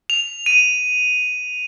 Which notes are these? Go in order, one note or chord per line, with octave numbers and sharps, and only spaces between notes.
F7
D#7